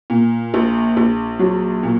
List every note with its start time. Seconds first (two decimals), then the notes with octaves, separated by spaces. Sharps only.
0.10 A#2
0.54 A#1
0.97 A#1
1.39 F#3
1.83 A#2